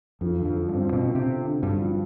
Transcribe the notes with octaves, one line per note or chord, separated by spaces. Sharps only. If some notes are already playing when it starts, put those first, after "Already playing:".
F2 F3
D3
F2
F3
G2
C4
B2 C4
C4
C3
D3
D3
G2 D3
F3